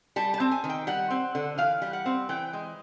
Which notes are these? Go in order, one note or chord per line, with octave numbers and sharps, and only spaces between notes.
G3 A5
A5
C4
G#5
D#3
G5
G3 F#5
C4
D3
E3 F5
G3
F#5
C4
E3 G5
G#3